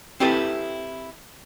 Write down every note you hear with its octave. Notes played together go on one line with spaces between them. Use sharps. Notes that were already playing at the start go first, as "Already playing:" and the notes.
C4 E4 G4 A4 B4